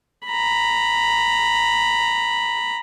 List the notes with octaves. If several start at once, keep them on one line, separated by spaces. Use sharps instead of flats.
A#5 B5